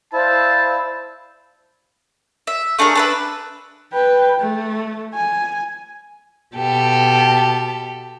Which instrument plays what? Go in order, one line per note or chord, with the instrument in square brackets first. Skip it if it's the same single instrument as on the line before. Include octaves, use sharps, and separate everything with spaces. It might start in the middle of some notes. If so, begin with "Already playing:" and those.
[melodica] E4 [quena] C5 [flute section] D5 F5 E6 [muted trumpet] A5
[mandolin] E5
A3 D4 G#4 A#4
D4 B4 E5
[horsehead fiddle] B4 G5
A3
G#5
[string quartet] B2 G4 A4